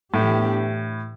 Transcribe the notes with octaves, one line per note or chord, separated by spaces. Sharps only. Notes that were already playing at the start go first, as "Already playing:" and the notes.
A2 E3 B3 D4 G4